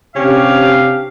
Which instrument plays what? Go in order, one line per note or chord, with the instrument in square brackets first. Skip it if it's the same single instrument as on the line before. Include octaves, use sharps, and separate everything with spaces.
[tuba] C3 [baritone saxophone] C#4 [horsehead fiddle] D4 G4 [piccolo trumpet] F5